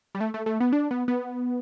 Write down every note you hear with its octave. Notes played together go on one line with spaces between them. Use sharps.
G3
A3
A3
A3
B3
D4
B3
B3